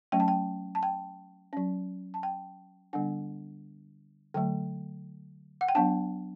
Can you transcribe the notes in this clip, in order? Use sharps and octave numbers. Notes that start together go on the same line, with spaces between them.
F#3 A3 C#4 G5
A5
G5
A5
G5
F#3 C#4
A5
G5
D3 G3 B3 D4 F#5
D3 F#3 A3 G5
F#5
G5
F#3 B3 D4 A5